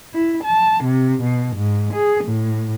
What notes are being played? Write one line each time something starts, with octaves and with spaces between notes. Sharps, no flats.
E4
A5
C3
B2
G#2
G#4
A2